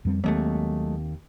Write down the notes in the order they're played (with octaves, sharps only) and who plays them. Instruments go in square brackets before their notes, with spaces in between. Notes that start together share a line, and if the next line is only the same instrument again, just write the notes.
[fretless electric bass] F2 G3 C4
[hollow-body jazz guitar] D#2 [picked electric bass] F#3 G#3 A3 [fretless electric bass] C4